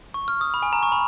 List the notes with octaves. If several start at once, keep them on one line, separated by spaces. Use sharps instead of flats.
C#6
F6
D#6
B5
G#5
A#5
C#6
B5